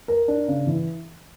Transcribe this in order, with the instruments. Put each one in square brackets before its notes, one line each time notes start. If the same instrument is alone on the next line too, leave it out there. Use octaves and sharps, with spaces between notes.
[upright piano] A#4
D4
C#3
E3